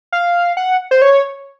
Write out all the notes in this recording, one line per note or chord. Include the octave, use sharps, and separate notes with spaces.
F5
F#5
C5
C#5